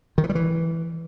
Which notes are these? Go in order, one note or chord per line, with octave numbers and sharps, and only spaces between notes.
D#3
E3
G3
E3